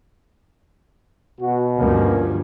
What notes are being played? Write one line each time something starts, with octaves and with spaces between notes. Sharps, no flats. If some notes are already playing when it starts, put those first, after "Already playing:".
B2 F#4
D2 G2 F3 A#3 C#4